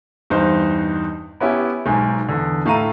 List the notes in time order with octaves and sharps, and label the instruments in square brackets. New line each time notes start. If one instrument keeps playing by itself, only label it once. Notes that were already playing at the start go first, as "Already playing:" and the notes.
[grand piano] E2 G2 D#4 C5
B3 C#4 E4 G4
B1 G#2 G#5
E2 D3
A2 A3 F5 A#5 D#7